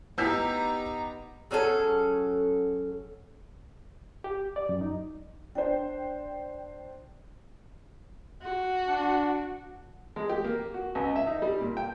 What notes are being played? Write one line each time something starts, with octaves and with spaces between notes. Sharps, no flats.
B3 D#4 G4 A#5 E6 G6 B6
F#3 C#4 G#4 A4
G4
D5
F#2
D#4
D4 C5 G5
F#4
D4
G#3
G4
A#3
F#4
C#2
E5
D#4
G3
A#2
G5